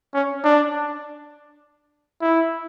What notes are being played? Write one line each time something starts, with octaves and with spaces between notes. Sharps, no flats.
C#4
D4
E4